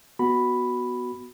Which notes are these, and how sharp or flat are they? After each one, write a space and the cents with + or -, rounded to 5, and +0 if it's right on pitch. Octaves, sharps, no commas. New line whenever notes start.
B3 +0 F#4 +0 B5 +0